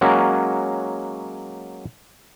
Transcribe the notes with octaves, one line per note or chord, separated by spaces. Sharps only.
F#3 G#3 A#3 C#4 F#4